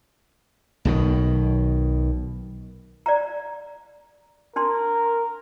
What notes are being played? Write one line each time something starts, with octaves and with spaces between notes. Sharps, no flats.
B1 B2 D#3
D5 F5 A#5
D4 A#4 A5 C6